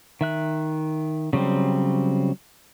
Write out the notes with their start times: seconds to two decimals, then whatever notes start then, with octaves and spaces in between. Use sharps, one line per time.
0.21 D#3 E5 F#6
1.33 C#3 F#3 G3 C4